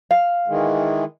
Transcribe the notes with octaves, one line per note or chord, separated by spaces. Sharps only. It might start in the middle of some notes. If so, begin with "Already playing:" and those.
F5
D#3 E3 G#3